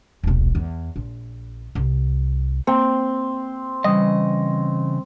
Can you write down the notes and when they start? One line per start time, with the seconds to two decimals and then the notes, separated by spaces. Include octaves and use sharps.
0.23 D#1 B1
0.55 E2
0.96 A#1
1.75 C2
2.67 A#3 C4
3.84 C#3 E3 G3 D#5 D#6